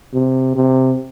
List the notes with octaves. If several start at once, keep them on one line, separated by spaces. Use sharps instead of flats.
C3
C3